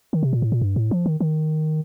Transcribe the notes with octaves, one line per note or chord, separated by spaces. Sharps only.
D#3
C3
A#2
A2
A#2
G2
A2
F3
D#3
D#3